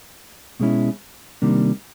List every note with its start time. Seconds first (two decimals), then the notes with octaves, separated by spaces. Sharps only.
0.60 B2 G#3 C#4 E4
1.42 C3 D#3 G3 A#3 D4